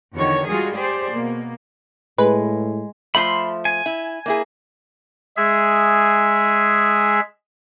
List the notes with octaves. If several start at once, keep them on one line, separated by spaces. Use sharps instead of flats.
E2 D3 D#3 F#4 C#5
G3 G#3 F4 F#4 G#4
G4 G#4 C5 D5
B2 A#3
A2 G#3 B4
F3 A3 E5 B5 C6
G#5
E4
A#3 E4 G#4
G#3 G#4 E5